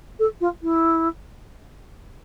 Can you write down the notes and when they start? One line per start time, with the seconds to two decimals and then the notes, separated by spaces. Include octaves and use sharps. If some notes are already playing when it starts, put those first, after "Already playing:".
0.19 A4
0.41 F4
0.63 E4